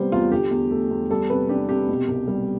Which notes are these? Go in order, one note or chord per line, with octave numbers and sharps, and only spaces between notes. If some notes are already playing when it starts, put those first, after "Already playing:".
Already playing: C3 G3 B3 C5
E2 F4
D3 G4
E2
A3
E2
G3 A4
C3 B4
D4 G4
C3 G4
B2
C2
G3